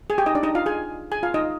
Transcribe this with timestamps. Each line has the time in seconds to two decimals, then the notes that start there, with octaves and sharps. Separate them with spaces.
0.10 G#4 G#5
0.18 G4 G5
0.26 D#4 D#5
0.35 D4 D5
0.43 D#4 D#5
0.55 F4 F5
0.66 G#4 G#5
1.11 G#4 G#5
1.23 F4 F5
1.34 D#4 D#5